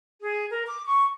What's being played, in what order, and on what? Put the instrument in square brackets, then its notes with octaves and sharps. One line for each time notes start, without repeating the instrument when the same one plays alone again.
[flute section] G#4
A#4
D6
C#6